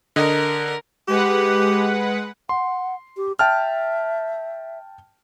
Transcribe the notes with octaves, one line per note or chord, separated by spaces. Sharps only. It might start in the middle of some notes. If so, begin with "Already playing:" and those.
D3 A#4 D#5
G#3 G4 B4 F#5
F#5 C6
G4
E5 G5 A5 F6